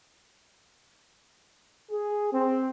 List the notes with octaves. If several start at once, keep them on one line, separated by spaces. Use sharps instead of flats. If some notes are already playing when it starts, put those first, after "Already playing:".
G#4
C4